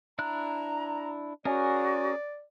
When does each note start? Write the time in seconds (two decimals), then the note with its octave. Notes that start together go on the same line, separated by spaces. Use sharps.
0.19 D4 E4 A#5 F#6
1.45 C#4 F#4 G#4 A#4 D5